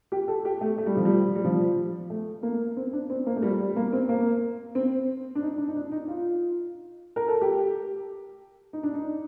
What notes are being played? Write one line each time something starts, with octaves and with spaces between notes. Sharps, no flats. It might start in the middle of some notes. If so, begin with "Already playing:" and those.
G4
A4
G4
A3
A3
G3
F3
G3
G3
F3
A3
A#3
C4
D4
C4
A#3
A3
G3
G3
A#3
C4
A#3
C4
D4
D#4
D4
D#4
D4
D#4
F4
A#4
A4
G4
D#4
D4
D#4